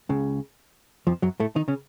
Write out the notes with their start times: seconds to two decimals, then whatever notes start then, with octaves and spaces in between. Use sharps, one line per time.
0.09 C#2 C#3
1.07 F2 F3
1.22 F#2 F#3
1.40 A2 A3
1.56 D#3 D#4
1.68 C#3 C#4